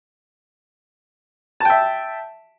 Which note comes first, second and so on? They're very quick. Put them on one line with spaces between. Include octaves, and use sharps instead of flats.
A5 G5 E5